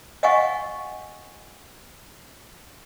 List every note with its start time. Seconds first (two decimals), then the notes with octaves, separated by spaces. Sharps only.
0.23 D#5 F5 F#5 G#5 C#6